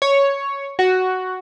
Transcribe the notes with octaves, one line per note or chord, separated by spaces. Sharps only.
C#5
F#4